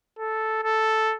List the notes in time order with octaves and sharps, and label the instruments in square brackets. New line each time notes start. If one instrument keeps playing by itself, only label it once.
[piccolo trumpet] A4
A4